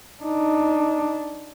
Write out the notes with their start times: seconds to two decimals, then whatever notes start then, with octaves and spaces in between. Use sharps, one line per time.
0.23 D4 D#4